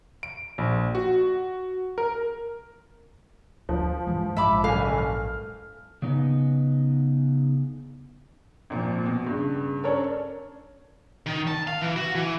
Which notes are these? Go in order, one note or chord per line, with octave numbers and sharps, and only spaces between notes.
D7
A#1
F#4
A#4
D2 F3
G2 E3 G#3
A#1 G#2 G#3 E5 B5 D6
F#1 A4 F5 G#5
F6
C#3 B3 D#4
G#1 A#2 F3
B2
G2 C#3
C#4 D4 A4 A#4 C#5
D#3
A5
F5
E3
F#4
E3